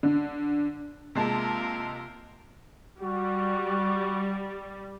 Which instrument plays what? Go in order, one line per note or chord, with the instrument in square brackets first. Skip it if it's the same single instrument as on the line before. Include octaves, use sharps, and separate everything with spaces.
[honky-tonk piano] D3
[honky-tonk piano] C3 G#3 A5 [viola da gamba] A#3 F4 A#4
[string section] G3 [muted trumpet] F#4